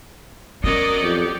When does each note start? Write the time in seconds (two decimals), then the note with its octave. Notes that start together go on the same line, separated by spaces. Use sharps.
0.64 F#3 B3 C#4 A#4 D5 D#5
1.03 F2 G4